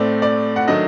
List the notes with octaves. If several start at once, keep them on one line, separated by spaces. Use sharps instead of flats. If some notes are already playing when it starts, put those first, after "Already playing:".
Already playing: A2 A3 C4 D5
D5
F#5
D#3 F#3 A3 D4 D#5